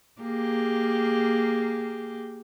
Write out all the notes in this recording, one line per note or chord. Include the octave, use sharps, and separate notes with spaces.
A#3 G4 G#4